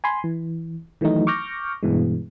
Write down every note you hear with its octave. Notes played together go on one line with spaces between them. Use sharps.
G#5 B5 C6
E3
D#3 E3 F#3 A3 D#4
C#6 D6 F6 G6 A#6
G2 B2 E3 G#3